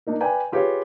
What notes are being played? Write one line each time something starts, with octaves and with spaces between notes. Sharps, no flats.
A#3 D4 D#4 A#4
B4 D5 G5 G#5
F4 G4 G#4 B4 C#5 F5